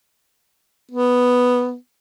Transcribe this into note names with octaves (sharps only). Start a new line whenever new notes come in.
B3